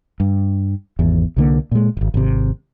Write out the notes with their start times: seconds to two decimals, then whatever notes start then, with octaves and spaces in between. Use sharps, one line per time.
0.20 G2
0.99 G#1 E2
1.36 C2 D3 A#3
1.71 A#2 G#3
1.97 D#1 G#1
2.14 G#1 C3